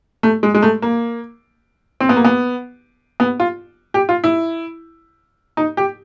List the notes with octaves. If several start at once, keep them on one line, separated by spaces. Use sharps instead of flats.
A3
G#3
G#3
A3
A#3
C4
B3
A#3
B3
B3
F4
G4
F4
E4
D#4
G4